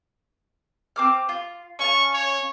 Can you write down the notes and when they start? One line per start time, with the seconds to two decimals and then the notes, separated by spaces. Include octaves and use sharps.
0.96 C4 D6 F6
1.29 F4
1.79 C#4 F5 A5 C#6
2.14 C#5